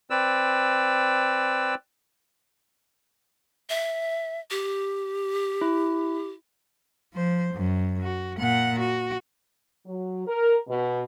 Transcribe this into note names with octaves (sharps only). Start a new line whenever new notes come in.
C4 B4 D5 E6
E5
G4
E4
F3 C5
F#2
F#4
A#2 F#5
F#4
F#3
A#4
B2